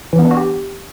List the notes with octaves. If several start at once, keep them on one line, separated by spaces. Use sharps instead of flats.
E3
B3
D4
F#4
G4